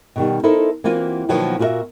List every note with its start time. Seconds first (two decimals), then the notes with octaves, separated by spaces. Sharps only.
0.16 B2 D#3 G3
0.43 D#4 E4 A4 A#4 C5
0.84 E3 A#3 C4 F4 F#4
1.29 B2 D#3 F3 F#3 A#3 B3
1.59 A#2 F4 F#4 G#4 A#4 E5